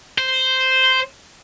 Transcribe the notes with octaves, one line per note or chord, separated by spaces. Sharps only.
C5